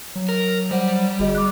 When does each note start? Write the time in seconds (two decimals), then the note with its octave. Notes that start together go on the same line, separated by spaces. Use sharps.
0.15 F#3
0.29 A#4
0.71 G3 C5 F#5
1.19 G1 F#4 G#4 D#5
1.35 D6 F#6